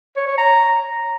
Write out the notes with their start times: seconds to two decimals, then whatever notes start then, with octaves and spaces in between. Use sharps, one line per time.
0.17 C#5
0.27 C#5
0.38 A#5